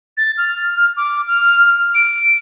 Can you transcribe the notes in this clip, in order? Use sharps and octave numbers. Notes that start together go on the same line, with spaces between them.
A6
F6
D6
F6
D7